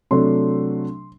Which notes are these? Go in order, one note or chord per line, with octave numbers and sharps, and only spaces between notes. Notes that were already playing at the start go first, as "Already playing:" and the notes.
C3 F#3 A3 D4 C6